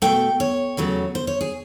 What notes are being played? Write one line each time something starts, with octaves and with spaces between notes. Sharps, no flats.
B2 F#3 A3 G5
C#5
E2 C#3 F#3 A3
C5
C#5
G#4